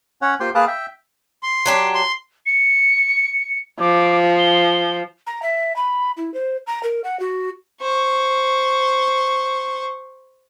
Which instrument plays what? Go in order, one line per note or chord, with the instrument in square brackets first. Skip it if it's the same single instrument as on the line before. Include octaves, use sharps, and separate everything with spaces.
[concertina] C#4 C#5 F#5
A#3 F4 G4 C5 G5 C6
A#3 G#4 B4 F5 A5 D6
E5 G5
[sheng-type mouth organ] C6
[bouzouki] F#3 D4 G4
[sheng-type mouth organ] C6
[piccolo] C#7
[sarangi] F3 [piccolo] D6
[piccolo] G7
[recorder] A#5
E5
B5
E4
C5
A#5
A#4
F#5
F#4
[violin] C5 C#6